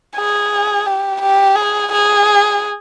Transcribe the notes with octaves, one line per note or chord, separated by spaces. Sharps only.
G#4
G4
G4
G#4
G#4